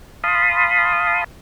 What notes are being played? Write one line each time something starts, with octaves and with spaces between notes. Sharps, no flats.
F5 A5 B5 C6 D#6